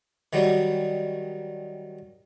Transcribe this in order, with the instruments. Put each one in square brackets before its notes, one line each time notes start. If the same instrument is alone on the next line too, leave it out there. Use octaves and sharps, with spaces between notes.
[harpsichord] D#3 F#3 G3